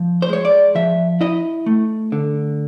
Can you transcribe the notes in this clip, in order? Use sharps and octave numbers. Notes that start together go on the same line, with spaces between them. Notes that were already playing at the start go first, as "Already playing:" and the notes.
Already playing: F3
C5
G#3 C#5
D5
F3 E5
E4 D#5
A3
D3